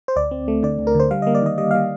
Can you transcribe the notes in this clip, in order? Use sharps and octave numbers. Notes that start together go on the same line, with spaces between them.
C5
D2 D5
C4
A3
D3 D5
D2
A#4
D3
C5
G3 F5
A#3 D#5
D5
D#3 D#5
G3 D#5
G3 F5